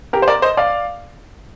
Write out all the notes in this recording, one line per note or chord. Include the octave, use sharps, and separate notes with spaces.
G4 A#4
C5
A#4 D5
C5 D#5
D5 F5